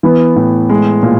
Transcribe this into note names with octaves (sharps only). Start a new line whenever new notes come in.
E3 B3
A2
G#3
A#2